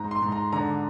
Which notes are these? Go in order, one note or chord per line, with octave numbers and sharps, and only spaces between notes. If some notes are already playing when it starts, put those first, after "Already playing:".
Already playing: G#2 A#5
C6
G#2
A#5
D3 A#5